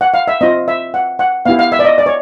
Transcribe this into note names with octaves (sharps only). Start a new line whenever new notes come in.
F#5
F5
E5
C4 F4 D#5
E5
F#5
F#5
B3 E4 G4 F5
F5
E5
D5
D#5
D5
C#5